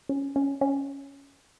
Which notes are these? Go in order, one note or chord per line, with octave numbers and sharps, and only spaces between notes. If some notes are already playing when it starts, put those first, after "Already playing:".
C#4
C#4
C#4